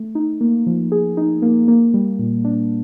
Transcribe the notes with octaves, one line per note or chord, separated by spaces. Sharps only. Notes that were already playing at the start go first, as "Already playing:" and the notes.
Already playing: A3
D#4
A#3
F3
G#4
D#4
A#3
A#3
G3
A#2
D4